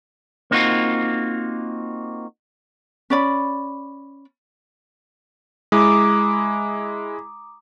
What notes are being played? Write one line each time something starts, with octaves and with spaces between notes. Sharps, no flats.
A#3 C4 D#4 F4 F#4
C#4 D5 B5
G#3 E4 A#5 D6 D#6